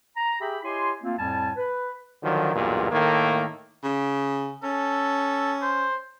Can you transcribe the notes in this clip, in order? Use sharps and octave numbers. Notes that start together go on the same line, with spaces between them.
A#5
G4 G#4 E5 G5 B5
E4 G4 C#5 D#5 G#5 C6
A3 A#3 C4 F4
F2 A2 G3 G#5 A5
B4
D3 D#3 F3 F#3
B1 E2 G2 A#2
A2 D#3 A3 A#3
C#3
C#4 A4
C5